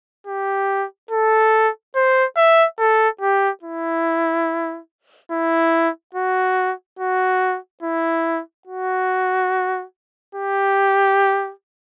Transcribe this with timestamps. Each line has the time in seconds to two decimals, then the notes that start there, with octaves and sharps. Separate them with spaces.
0.27 G4
1.11 A4
1.96 C5
2.37 E5
2.80 A4
3.21 G4
3.63 E4
5.31 E4
6.15 F#4
6.99 F#4
7.83 E4
8.67 F#4
10.35 G4